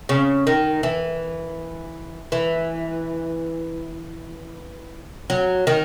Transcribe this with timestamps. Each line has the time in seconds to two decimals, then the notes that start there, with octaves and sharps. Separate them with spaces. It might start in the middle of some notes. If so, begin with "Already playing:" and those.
0.09 C#3
0.47 D#3
0.83 E3
2.32 E3
5.30 F#3
5.67 D#3